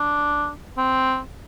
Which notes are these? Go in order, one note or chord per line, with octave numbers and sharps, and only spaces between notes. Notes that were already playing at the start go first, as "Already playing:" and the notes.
Already playing: D4
C4